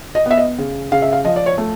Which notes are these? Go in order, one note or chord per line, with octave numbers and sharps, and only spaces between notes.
D#5
B3 E5
D#5
C#3
C#3 F5
E5
F5
F3 D#5
D5
C#5
A3